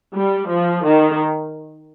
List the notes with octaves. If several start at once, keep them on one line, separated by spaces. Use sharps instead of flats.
G3
F3
D#3